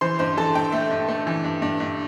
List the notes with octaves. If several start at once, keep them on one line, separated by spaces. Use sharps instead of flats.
E3 C5 C6
G2 C5 C6
E3 A4 A5
G2 G5
A3 E5
G2
A3
E3
G2
G2
G2